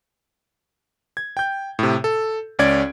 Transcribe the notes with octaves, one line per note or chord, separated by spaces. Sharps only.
G#6
G5 G6
A2 C3
A4
C#2 C#4 D5 G#6 D7